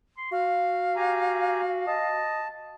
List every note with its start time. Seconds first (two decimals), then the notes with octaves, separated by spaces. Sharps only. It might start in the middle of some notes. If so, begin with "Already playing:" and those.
0.18 C6
0.32 F#4 F5
0.96 G4 G#5 A#5
1.87 D#5 A5